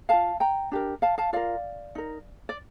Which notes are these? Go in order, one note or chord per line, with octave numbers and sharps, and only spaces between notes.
F4 A#4 F5 A5
G5 A#5
D4 G4 A#4
F5 A5
F5 A5
F4 A#4 D5 F5
D#4 A#4
D5